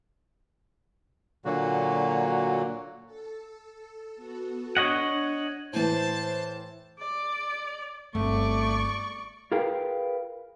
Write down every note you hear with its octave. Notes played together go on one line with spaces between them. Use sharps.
A#2 D3 F#3 A#3 F#4
A4
B3 F#4 A4
D4 C#5 D#5 F#5
A2 E3 C5 A5
D5
G1 A3 C4 D5 C#6
F4 G#4 A#4 B4 F5 G5